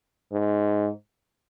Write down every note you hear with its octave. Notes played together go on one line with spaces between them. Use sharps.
G#2